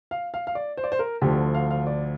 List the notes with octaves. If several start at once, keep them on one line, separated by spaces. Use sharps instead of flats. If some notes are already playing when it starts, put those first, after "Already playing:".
F5
F5
F5
D5
C5
D5
C5
A#4
D2 D3 F3 G4
F5
F5
D5